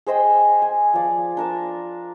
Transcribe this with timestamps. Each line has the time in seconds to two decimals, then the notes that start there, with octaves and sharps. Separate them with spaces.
0.07 G#4 C5 D#5 G5
0.62 G#5
0.94 F3 D5
1.37 D4 A#4 A5